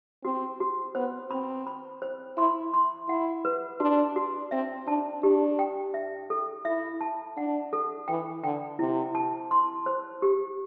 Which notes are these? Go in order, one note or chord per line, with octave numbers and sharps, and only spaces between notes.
C4 F#4
F#4
B3 C5
C4 B5
B5
C5
E4 C6
C6
E4 F#5
B4
D4 F#4
F#4
C4 E5
D4 A5
D4 G4
G5
E5
A4
E4 E5
A5
D4 F#5
A4
E3 G5
D3 G5
C3 E4
A5
C6
C5
G4